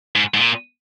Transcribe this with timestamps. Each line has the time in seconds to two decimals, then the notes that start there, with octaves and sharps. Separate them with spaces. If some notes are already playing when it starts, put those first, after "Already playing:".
0.15 G#2
0.34 G#2
0.37 A#2